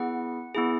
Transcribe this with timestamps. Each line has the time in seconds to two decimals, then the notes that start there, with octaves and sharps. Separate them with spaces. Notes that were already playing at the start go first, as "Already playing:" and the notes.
Already playing: B3 E4 G#4 F#5
0.54 B3 E4 G#4